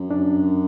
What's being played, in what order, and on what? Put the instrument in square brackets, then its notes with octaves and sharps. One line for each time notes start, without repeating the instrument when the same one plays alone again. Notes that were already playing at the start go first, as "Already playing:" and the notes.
Already playing: [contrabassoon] F#2
[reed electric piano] D4